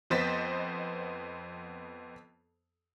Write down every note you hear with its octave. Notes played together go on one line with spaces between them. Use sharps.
F2 B3 C5 D#5 A6 B6